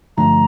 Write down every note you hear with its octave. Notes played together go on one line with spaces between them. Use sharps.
G2 D3 F3 A3 D4 A#5